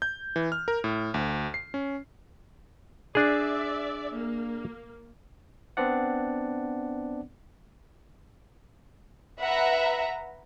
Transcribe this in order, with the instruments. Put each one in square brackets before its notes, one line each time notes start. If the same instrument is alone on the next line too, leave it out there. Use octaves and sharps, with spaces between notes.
[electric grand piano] G6
E3
F6
A#4
A2
D2
C7
C#4
[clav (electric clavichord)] D4 G#4 [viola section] D5 E5
[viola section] A#3
[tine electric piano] B3 C4 D4 D5 F#5
[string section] B4 E5 F#5 A#5